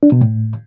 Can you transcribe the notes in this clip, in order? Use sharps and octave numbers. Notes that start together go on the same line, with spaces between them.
D4
B2
A2